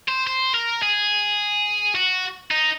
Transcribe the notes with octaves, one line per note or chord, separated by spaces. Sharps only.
C5
C5
A#4
G#4
F#4
D#4